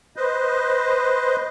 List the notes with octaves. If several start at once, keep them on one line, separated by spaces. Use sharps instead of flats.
B4 C5 D#5